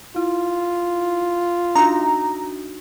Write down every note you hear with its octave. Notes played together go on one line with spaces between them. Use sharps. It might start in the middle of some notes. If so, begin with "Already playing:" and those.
E4 F4
D4 D#4 F#4 A#5